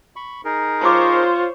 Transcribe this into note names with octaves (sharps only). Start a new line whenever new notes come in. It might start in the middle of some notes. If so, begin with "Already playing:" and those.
B5 C#6
D#4 G#4 A#4
F4 C5 C#5 A5 C6 D6